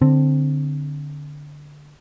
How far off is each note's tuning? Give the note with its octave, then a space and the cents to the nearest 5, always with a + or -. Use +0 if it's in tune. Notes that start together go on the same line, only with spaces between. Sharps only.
D3 +0 C4 +0